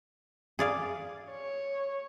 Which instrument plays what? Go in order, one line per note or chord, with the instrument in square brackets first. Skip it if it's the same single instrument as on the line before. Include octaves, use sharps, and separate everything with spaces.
[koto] G#4 D5 F5
[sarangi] C#5